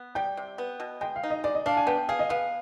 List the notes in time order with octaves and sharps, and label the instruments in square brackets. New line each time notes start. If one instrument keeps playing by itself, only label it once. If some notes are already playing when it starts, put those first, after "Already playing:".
Already playing: [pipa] B3
[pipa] G3 [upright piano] G5
[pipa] C3
B3
B2
[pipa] G#3 [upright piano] G5
[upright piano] F5
[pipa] D#4
[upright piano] D#5
[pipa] G#3 [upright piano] D5
[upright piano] D#5
[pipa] D4 [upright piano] F5
[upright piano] G#5
[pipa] B3 [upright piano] G5
[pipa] G#4 [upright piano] F5
[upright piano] D#5
[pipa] B3 [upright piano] F5